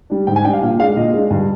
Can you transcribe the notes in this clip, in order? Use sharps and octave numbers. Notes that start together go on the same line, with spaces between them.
G3 D4
G#2 G5
G#5
G3 D4 F5 G5
A#2 F5
G#3 D4 F5
A#2 D#5
G#3 D4
G2